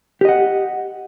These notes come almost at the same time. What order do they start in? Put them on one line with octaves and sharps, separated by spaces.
G4 D#5 F#5